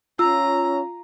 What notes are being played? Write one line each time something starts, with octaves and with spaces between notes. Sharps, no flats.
C#4 F4 A#5 E6